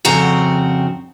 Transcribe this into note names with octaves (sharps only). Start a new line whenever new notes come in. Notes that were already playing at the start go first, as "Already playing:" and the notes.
F2 C#3 C4 F#4 A#5